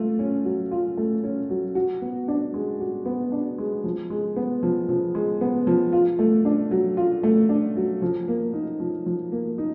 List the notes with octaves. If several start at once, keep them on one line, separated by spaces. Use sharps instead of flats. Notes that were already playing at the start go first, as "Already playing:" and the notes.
Already playing: A3 F4
C#4
F#3
F4
A3
C#4
F#3
F#4
B3
D4
G#3
F#4
B3
D4
G#3
F3
G#3
B3
F3
F3
G#3
B3
F3
F4
A3
D4
F#3
F4
A3
D4
F#3
F3
A#3
D#4
F3
F3
A#3
D#4